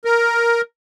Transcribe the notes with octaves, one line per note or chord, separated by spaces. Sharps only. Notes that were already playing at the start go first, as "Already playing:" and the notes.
A#4